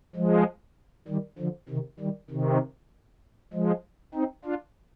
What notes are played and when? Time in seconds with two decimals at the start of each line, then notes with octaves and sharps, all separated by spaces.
0.16 F3 G#3
1.08 D#3 G3
1.38 D3 F3
1.69 C3 D#3
2.00 D#3 G3
2.30 C3 D#3
3.53 F3 G#3
4.14 C4 D#4
4.45 D4 F4